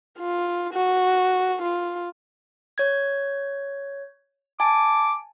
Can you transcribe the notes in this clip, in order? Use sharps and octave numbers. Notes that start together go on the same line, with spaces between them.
F4
F#4
F4
C#5 G#6
G#5 A5 D6